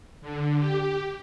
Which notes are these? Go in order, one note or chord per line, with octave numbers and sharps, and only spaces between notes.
D3
G4